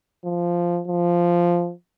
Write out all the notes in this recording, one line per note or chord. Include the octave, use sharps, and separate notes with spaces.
F3
F3